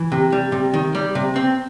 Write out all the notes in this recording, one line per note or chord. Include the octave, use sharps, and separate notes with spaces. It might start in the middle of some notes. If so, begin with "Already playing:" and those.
Already playing: E3
C3
G3
C3
D#3
G3
C3
C4